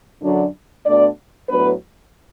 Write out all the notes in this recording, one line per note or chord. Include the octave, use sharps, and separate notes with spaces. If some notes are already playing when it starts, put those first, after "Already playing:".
F#2 D3 F#3 D4
B2 A3 D4 D5
A2 F#3 B3 D4 B4